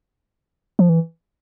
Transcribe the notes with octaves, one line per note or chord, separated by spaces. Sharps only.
F3
E3